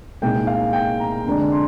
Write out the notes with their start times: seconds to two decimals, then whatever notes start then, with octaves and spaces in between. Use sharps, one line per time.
0.22 C2 A#2 G#3 D#4 G5
0.47 F5
0.73 G5
1.00 A#5
1.25 F2 D3 G#3 D4 A#5
1.52 C6